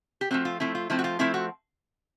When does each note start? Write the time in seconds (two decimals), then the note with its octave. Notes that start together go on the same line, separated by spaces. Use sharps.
0.21 G4
0.31 F3 A3 C4 F#4
0.45 F4
0.60 F3 A3 C4 E4
0.75 F4
0.90 F3 A3 C4 E4
0.99 F#4
1.04 F4
1.19 F3 A3 C4 E4
1.34 F#4